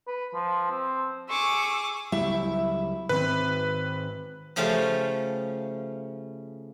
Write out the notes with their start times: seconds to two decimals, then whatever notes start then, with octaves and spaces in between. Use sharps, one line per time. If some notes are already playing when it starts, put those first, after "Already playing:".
0.07 B4
0.34 F3
0.70 C4
1.29 G#4 C#6 D6 E6
2.12 C#2 F#3 G3 E4 E5
3.09 G#2 D#3 C4 B4
4.56 C#3 F3 A3 C#4 G4 C5